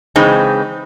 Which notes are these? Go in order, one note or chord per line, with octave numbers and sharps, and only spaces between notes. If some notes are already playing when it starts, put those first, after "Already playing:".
C#3 E3 G#3 C4 D#4